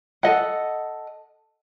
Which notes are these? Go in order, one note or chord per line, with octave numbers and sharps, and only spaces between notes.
A4 D#5 F#5